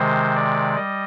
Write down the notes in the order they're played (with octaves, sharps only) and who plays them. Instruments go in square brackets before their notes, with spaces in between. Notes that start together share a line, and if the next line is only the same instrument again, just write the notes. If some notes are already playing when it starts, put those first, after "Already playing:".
Already playing: [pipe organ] C3 D#3 G#3 C5
D5
G3 D#5